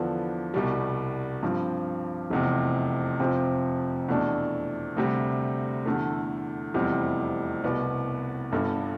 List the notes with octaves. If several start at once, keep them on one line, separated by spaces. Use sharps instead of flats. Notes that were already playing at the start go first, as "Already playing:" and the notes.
Already playing: E2 D3 F3 B3 D4
C2 B2 G3
G2 F3 C4
F1 E2 C3
F2 C3 F3 C4
E2 B2 A3 D4
D2 C3 G3
E2 D3 A3
F1 E2 C3 G3
C2 B2 B3
G1 G2 D3